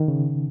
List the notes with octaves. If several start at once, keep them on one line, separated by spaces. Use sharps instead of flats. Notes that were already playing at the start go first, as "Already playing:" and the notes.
Already playing: D#3
C#3